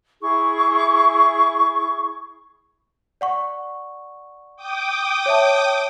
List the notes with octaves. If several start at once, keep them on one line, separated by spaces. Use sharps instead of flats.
E4 G#4 C#6
D5 F#5 C#6
G5 D6 D#6
C#5 E5 A5